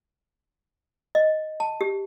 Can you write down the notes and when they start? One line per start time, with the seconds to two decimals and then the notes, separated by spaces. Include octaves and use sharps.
1.15 D#5
1.60 A5
1.81 G4